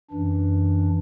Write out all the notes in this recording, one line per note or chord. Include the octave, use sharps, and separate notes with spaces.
F#2 E3 D4